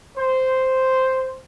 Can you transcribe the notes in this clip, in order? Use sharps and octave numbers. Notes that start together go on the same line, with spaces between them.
C5